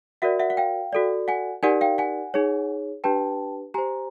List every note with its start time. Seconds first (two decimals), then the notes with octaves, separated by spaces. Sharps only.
0.22 F#4 A#4 D5 E5 F#5
0.40 E5 F#5
0.50 F#5
0.57 F5 G5
0.93 F#4 A4 D5
1.28 F#5 G#5
1.63 D#4 G4 A#4 D5 F#5 G#5
1.81 F5 G5
1.98 F#5 G#5
2.34 D#4 G#4 C#5
3.04 D4 G4 B4 G5 A5
3.74 G4 C5 G#5 A#5